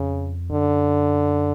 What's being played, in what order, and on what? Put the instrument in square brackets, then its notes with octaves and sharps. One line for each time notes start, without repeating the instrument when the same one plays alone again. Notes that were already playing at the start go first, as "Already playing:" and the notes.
Already playing: [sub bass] F2 [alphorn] C#3
[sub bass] F#2 [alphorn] D3